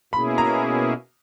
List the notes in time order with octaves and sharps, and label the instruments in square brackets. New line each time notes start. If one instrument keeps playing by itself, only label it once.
[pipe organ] B2 A#3 C#4 E4 G#4 [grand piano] B5
[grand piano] A#5